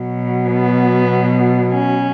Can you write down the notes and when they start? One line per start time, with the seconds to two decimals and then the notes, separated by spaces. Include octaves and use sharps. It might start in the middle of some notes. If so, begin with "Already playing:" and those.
Already playing: B2 F#3
0.49 B3
1.72 C#4